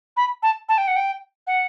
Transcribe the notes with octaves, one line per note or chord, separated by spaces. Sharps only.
B5
A5
A5
G5
F#5
G5
F#5